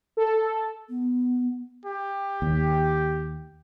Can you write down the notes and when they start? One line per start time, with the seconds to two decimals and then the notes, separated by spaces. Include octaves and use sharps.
0.17 A4
0.89 B3
1.85 G4
2.42 D#2